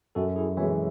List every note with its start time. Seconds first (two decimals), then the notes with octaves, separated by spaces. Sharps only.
0.15 F#2 F#4 A4
0.36 E4 G#4
0.57 E3 G#3 C#5 E5